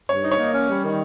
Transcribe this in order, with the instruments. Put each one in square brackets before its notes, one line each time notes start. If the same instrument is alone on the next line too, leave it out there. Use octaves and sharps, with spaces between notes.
[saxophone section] G2 [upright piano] C#5
[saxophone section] D#4
[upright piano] C#5
[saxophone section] A#3
C#4
G3
D#3